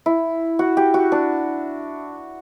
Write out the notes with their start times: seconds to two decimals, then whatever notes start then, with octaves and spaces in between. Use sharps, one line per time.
0.06 E4
0.59 F#4
0.77 G4
0.94 F#4
1.12 D4